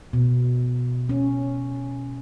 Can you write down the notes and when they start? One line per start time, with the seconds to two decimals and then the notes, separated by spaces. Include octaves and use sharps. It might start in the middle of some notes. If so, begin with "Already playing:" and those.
0.13 B2
1.09 C#4